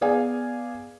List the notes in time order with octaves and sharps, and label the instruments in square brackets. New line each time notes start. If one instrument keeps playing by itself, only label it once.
[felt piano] B3 G#4 D5 F5 G#5